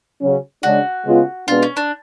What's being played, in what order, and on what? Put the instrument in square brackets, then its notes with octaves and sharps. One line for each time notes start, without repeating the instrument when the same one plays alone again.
[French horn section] C#3 F#3 C#4
[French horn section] C#3 G#3 D4 [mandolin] F#4
[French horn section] C#3 G#3 B3 F4
[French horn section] B2 G#3 B3 D4 [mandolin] F4
[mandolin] C#4
D4